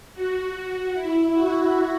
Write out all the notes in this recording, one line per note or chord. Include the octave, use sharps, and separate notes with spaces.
F#4
E4
F#4